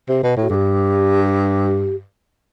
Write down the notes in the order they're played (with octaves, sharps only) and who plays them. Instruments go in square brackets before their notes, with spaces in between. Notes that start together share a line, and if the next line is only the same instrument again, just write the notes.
[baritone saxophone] C3
B2
A2
[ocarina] F#4
[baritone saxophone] G2 [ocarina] G4 A4
[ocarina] G4